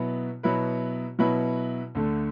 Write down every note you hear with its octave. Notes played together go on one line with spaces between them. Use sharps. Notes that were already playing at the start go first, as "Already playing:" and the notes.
Already playing: B2 F#3 B3 E4 B4
B2 F#3 B3 E4 B4
B2 F#3 B3 E4 B4
D2 D3 A3